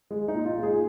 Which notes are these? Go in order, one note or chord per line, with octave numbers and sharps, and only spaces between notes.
G#3
D#4
A#2
F4
G#3
G#4